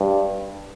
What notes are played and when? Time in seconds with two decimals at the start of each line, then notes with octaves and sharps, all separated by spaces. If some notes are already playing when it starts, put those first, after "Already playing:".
Already playing: G2